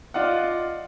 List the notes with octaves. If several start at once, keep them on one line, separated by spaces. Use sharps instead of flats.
F4 D5 D#5 F5 F#5